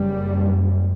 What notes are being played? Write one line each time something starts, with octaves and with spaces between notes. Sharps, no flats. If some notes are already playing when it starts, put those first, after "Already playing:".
Already playing: F#1 F#2 G3